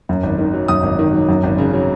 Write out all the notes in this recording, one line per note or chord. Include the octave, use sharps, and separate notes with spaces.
F#2
G#1
D#3
F#3
F#2 D#6
G#1
D#3
F#3
F#2
G#1
C#3
F#3